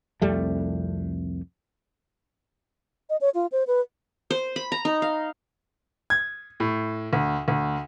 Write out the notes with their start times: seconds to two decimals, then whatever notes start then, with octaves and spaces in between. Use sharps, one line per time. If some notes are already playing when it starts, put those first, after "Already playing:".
0.22 C2 F2 G3 A3
3.10 D#5
3.21 C#5
3.35 F4
3.52 C5
3.67 B4
4.31 C5
4.56 B5
4.72 A#5
4.85 D#4
5.02 F5
6.10 G#6
6.60 A2
7.13 D2
7.48 D2